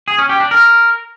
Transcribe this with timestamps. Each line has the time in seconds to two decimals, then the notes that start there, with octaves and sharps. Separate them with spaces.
0.08 G#4
0.18 C#4
0.29 G4
0.40 D4
0.51 A#4